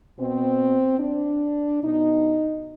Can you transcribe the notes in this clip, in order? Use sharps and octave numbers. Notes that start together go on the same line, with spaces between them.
B2 C4
D4
B2 D#4